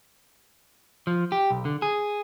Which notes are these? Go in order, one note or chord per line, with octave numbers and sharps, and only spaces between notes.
F3
G4
B1
D3
G#4